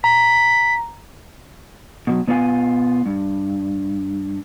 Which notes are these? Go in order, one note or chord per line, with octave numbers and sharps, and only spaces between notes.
A#5 B6
B2 F#3
B2 B3 F4 A4 G#5
G2